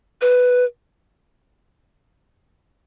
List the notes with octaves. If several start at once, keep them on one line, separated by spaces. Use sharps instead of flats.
B4